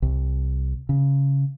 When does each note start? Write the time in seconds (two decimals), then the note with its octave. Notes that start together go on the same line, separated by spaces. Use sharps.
0.02 C2
0.89 C#3